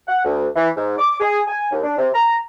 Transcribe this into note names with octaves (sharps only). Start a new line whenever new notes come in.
F#5
D2
E3
G#2
D6
G#4
G#5
D#2
D4
C3
A#5